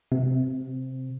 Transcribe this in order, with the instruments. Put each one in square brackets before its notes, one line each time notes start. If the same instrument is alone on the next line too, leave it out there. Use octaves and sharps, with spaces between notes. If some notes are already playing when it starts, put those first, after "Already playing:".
[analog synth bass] C3